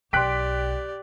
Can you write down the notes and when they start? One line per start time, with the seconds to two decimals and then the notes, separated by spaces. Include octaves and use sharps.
0.13 B1 G4 D5 G5 C6 F#6 B6 D7